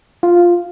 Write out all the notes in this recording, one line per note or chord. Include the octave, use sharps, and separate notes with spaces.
F4